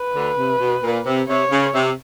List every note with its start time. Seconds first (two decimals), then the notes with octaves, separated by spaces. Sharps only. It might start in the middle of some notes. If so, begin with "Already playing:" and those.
Already playing: B4
0.15 D2 D3
0.37 C3
0.60 B2
0.83 A#2
1.06 C3
1.28 C3 C#5
1.51 C#3
1.74 C3